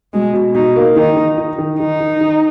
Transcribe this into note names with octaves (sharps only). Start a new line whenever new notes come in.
B2 G#3
B2
B2 D#4
A#3
D#3 D#4
D#3
D#4
D#3
D#3 D#4
D#3
D#3